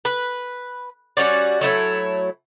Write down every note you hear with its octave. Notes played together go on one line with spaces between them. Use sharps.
B4
G3 C#4 F#4 D5
F#3 A3 E4 C#5